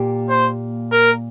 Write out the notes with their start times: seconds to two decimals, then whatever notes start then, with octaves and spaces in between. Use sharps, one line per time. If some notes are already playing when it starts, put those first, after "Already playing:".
Already playing: A#2 A#3 G4
0.29 C5
0.92 A#4